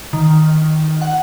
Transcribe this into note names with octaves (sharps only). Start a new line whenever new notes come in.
D#3
F#5